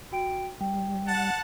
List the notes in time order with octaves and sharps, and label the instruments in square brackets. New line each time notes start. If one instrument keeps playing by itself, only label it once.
[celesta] F#4 G5 D7
[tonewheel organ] G3 [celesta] G5
[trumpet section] F#5 A5 [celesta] A6